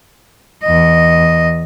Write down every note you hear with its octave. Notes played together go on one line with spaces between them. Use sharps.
E2 D#5